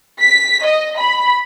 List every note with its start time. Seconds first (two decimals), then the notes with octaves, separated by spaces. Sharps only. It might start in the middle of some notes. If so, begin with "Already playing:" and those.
0.21 B6
0.65 D#5
0.98 B5